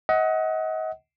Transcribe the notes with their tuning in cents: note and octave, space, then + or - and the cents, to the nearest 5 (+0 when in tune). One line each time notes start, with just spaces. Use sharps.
D#5 +35 F#5 +10